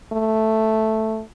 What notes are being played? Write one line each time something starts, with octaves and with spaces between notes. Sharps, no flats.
A3